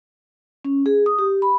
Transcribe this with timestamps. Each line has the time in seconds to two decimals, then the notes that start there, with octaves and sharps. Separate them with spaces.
0.65 C#4
0.86 G#4
1.06 D#6
1.19 G4
1.42 B5